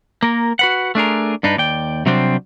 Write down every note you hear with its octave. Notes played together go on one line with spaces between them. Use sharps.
A#3 A#4
F#4 B4 F#5
A3 D4 G#4 A#4
G2 D4 D#4 B4
D#2 D5 G5
C3 F#3 G3 C4 D4 C5